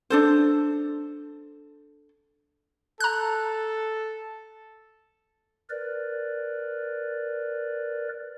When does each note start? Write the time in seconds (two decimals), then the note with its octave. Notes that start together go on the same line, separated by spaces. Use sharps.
0.10 D4 A4 C5
3.00 A4 A#5 F#6
5.70 A#4 B4 D5